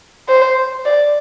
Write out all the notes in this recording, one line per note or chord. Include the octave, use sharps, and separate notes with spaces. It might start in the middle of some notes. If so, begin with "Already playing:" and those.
C5
D5